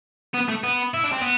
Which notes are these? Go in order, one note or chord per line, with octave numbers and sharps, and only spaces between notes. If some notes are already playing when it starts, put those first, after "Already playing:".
B3
A3
B3
E4
D4
C4
B3